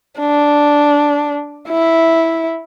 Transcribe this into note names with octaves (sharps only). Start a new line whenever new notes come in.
D4
E4